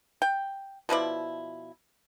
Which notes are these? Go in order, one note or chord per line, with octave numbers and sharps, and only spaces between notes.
G5
B2 F3 E4 D5